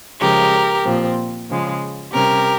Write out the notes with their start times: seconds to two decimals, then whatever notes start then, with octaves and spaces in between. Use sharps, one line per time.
0.20 C#3 F3 G#3 G4 A#4
0.85 A#2 F3 C4
1.49 C#3 F3 G#3
2.13 C3 G3 C#4 G4 A#4